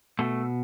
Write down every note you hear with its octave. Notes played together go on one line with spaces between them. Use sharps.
B2 A3